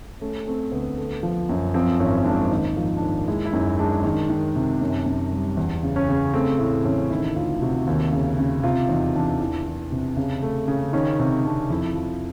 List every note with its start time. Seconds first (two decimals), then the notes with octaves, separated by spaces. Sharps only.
0.21 A3 C#4
0.47 A3 C4
0.72 D2 B3
0.98 A3
1.23 F3
1.49 F#2
1.74 F3 C4
2.00 G#1 C#4
2.25 G#2 D4
2.51 D#2 D#4
2.77 F3
2.96 D4
3.02 D#2 D#4
3.28 G#3 E4
3.45 E4
3.53 F#2 D#4
3.79 G#3 D4
4.04 D#3
4.30 D#3
4.56 C3
4.81 F#2
5.06 F#2
5.32 G3
5.57 E2
5.83 C#3
5.96 C#4
6.09 C#3
6.34 A3 C4
6.59 A2
6.85 A1 C#4
7.10 D#3 E4
7.36 D2 F4
7.62 C3 F#4
7.87 D#2
8.13 C#3
8.38 C#3
8.63 C3 F4
8.89 E2 D#4
9.15 E2 D4
9.40 E3
9.66 E3
9.92 C3
10.17 C#3
10.42 A3
10.68 C#3
10.93 D#3 C#4
11.19 C3 C#4
11.44 C3 D4
11.70 F2 E4
11.95 F3